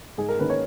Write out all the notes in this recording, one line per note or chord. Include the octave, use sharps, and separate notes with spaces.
G#2 G#4
A#4
D#3 A#3 C#4 B4
C#5